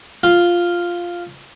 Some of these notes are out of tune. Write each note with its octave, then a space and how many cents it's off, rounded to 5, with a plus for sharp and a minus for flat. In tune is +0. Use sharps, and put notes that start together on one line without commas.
F4 +0